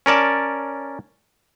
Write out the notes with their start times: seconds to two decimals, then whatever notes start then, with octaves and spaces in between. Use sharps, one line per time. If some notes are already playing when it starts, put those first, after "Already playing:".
0.06 C#4 A#4 D5 A5